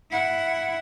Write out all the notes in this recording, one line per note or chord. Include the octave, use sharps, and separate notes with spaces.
E4 F#5